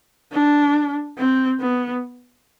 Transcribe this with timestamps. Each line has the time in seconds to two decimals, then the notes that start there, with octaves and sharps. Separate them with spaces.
0.33 D4
1.18 C4
1.60 B3